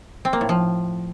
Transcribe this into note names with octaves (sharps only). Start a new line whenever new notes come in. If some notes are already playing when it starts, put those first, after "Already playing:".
C4
A#3
A2
F3